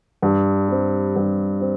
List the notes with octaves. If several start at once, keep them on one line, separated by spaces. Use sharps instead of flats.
G2
G3 C4
G2
C4